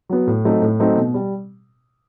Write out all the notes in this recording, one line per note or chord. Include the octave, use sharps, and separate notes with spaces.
F#3 B3 F#4
A2
F#3 A3 C4 D#4
A2
F#3 A3 C4 D#4
B2
G3